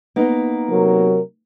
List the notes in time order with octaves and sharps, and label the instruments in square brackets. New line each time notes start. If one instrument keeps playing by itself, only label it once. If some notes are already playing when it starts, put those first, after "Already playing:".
[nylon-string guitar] A#3 B3 D#4
[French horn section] C3 F#3 A#4